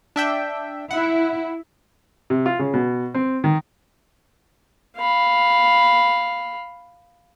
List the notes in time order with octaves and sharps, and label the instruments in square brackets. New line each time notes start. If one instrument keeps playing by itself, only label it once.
[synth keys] D4 E5 G5
[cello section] E4 [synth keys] F#5
[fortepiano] C3
F4
C#3
B2
C4
D#3
[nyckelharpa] F5 B5